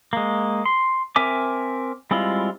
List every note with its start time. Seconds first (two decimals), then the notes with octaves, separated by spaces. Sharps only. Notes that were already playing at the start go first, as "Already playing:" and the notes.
0.13 G#3 A#3
0.65 C6
1.16 C4 A#4 E5 G#5 D6
2.11 G3 G#3 C4 E4 F4